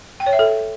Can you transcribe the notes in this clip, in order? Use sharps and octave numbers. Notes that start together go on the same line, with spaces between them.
G5
C#5
E5
A4